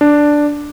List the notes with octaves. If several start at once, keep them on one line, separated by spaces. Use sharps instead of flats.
D4